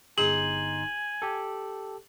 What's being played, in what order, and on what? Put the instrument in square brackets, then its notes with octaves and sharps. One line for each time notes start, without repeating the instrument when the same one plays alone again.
[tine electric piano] G1 D#4 C6 [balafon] G#4 [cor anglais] G#5 [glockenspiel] F#7
[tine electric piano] G4 A4